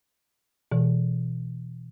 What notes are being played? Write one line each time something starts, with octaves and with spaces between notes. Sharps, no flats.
B2 E3